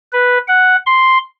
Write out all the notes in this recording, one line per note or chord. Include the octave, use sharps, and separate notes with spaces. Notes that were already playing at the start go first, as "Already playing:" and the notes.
B4
F#5
C6